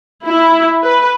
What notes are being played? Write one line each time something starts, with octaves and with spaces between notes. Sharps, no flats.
E4
B4